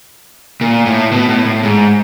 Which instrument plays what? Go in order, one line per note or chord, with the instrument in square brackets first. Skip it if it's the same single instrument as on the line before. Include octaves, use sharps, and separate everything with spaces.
[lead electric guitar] A#2
A2
B2
A2
A2
G#2